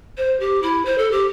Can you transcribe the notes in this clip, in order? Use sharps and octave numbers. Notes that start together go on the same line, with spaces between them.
C5
G4
E4
C5
A4
G4